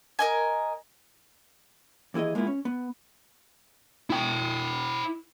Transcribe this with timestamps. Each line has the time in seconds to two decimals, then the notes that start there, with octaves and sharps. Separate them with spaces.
0.19 A#4 D#5 G#5
2.14 D#2 E3 E4 G#4 D#5
2.35 G#3 A#3 B3 E4 F4
2.47 C#4
2.65 B3
4.10 E4 G5